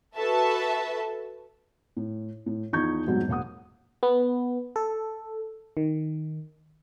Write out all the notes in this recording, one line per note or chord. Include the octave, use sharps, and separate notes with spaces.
F#4 A4 B4 E5 A5
A2
A2
E2 F3 D#4 C#6 G6 G#6
F2 G#2 B2 F#3 G3 B3
E1 A#3 F#5 D#6
B3
A4
D#3